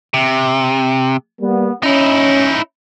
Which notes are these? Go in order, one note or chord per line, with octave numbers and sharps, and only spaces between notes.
C3
G3 A#3 B3
C#4 D#4 E4